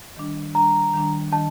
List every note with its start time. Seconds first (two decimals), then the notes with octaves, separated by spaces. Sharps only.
0.17 D#3 G3 D4
0.55 D#3 G3 D4 A#5
0.94 D#3 G3 D4
1.32 D#3 G3 D4 A5